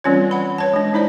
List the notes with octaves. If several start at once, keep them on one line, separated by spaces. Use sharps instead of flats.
E3 G3 C4 C#4 F4 C#5
F#5 B5
B4 C#5 A5
G#3 D4
D#4 E4 C5 D5